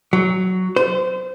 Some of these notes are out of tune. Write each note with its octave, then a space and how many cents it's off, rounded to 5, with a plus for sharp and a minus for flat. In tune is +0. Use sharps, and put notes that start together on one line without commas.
F#3 +5
C5 -25